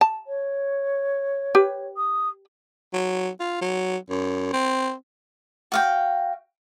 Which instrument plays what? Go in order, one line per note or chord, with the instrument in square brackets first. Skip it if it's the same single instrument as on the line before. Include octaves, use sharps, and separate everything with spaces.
[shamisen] A5
[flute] C#5
[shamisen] G4 B4
[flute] D#6
[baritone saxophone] F#3
F4
F#3
F#2
C4
[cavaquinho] F#4 F5 G5